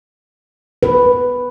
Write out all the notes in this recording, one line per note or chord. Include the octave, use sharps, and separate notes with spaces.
B4